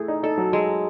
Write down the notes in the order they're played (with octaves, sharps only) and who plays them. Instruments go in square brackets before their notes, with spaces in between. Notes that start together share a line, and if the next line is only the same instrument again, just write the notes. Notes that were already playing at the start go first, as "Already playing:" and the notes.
Already playing: [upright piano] A3 [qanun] E4 G#4
[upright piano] D#4
[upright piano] D#4 [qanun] A4
[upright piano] F#3
[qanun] G#3